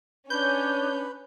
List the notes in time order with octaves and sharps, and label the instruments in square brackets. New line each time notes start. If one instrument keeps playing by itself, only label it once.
[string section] C#4 [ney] D4 [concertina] B4 [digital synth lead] G6